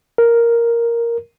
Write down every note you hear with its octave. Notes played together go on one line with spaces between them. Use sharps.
A#4